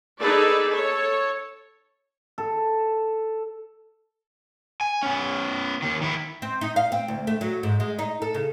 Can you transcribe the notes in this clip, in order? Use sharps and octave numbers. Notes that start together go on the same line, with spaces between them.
D#4 G#4 A4 B4 D5
A4 C#5
A4
G#5
B3 C#4
D#2 D#3
D#3 E4
C4
D#4
F5
C4
D2
A3
F#3
G#2
G#3
D#4
A4
C#3